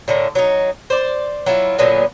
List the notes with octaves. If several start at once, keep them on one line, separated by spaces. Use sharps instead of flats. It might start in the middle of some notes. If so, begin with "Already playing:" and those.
A2 D3 A#4
F#3 D#4
C5 D5
F#3 E4 F4
A#2 D3 F#3 B3